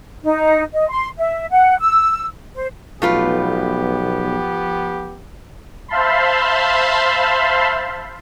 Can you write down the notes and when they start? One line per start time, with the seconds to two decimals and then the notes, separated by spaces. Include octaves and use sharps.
0.23 D#4
0.73 D#5
0.89 C6
1.18 E5
1.51 F#5
1.79 E6
2.54 C5
3.02 B1 F3 A3 B3 F4 G4 B4
5.88 C5 E5 F5 A5 B5 C6